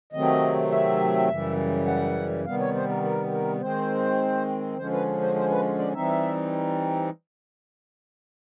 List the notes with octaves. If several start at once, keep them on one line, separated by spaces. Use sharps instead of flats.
C3 D#3 F#3 A3 C4 D#5
E5
F#2 C#3 E3 G3
F#5
C3 D#3 G3 B3 F5
C#5
C5
A#4
A#4
A#4
D#3 G#3 C4 C5
D3 F3 G#3 C#4 C5
B4
C5
C5
B4
D5
E3 G3 C4 D#4 E5